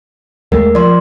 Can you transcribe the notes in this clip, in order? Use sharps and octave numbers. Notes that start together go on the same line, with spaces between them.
D#2 G#3 A3 A#4
F3 D5 C6